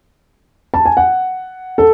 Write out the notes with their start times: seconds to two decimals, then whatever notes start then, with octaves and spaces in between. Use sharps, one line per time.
0.74 A5
0.86 G#5
0.97 F#5
1.78 A4